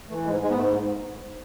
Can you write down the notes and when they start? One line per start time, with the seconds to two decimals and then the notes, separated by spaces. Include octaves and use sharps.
0.09 E3 A3
0.25 G#2 G#3
0.41 G#2 G#3
0.50 B3
0.57 G#2 A3